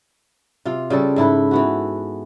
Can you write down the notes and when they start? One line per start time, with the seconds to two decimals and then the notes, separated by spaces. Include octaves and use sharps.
0.65 C3 F4
0.90 C#3 G3 A4
1.16 G#2 E4 A4 B4
1.51 E3 B3 F#4